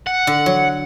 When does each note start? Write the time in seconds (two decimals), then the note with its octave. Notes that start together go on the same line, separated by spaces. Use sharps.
0.07 F#5
0.27 D3
0.46 F#3